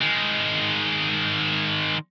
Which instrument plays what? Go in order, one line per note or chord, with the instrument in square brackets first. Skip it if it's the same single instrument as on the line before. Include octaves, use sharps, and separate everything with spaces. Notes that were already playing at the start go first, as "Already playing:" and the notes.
[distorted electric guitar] D#3 G#3